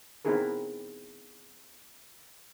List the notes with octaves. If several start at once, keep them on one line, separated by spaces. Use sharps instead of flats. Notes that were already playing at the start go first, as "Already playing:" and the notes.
B3 C4 D#4 E4 G#4 A#4